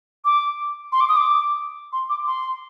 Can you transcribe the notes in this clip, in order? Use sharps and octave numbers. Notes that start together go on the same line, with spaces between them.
D6
C6
D6
D#6
D6
C6
D6
C6